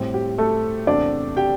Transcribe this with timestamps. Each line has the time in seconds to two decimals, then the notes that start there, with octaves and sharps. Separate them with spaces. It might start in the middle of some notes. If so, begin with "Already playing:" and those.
Already playing: A2 G3 C4
0.14 G4
0.38 A3 A4
0.87 E2 C3 A3 C4 D4 D5
1.37 G4 G5